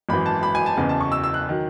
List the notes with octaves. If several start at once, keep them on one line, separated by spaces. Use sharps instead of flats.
G#1 F#2 E3 B5
A5
B5
G#5
A5
F#1 E2 C#3 E3 G#5
A5
C#6
E6
E6
F#6
D#3 F#3